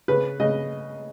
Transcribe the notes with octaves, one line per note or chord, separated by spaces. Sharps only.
C#3 B4
C#3 D#5